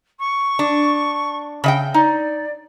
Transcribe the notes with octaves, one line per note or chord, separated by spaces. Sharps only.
C#6
D4
C#3 D#5 G5
D#4 D5